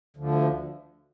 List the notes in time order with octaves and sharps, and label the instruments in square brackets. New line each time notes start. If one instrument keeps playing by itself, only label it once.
[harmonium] D2 D3 F3